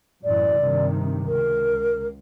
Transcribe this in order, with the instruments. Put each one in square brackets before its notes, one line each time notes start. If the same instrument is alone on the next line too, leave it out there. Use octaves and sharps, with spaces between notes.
[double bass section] F#2 A2 E3 [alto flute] D5
[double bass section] G2 C3 D#3
[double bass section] C#2 [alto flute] A#4